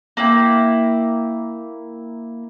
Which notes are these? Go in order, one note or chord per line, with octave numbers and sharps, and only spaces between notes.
A#3 E4 G5